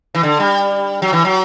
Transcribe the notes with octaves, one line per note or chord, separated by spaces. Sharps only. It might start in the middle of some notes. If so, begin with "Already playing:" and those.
E3
D3
G3
F#3
E3
F#3